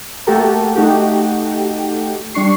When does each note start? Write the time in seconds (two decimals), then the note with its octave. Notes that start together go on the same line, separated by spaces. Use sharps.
0.27 A3 A#3 F#4 G4 A4 A#4
0.76 A3 D#4 F#4 G4
2.34 G3 D4 C#6 C7